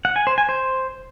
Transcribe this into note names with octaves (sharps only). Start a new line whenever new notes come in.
F#5
G#5
C5
G#5
C5